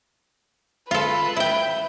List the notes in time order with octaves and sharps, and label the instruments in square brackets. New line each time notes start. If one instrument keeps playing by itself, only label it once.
[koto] F4 A4 [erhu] B4
[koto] E4 G5